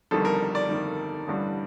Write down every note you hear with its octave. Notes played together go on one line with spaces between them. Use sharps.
G1 F2 D#3 G3 A4
A#4
D5
G1 F2 D#3 G3
A1 G2 D3 G3